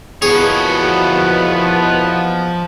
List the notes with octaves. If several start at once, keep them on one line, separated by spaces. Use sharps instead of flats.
A#1 E2 B2 F3 B3 G#4 C#5